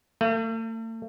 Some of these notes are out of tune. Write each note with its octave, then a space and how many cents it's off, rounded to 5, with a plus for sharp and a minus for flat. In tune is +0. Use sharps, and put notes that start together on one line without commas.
A3 +40